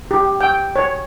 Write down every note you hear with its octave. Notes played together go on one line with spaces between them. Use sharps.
G4
G5
C#5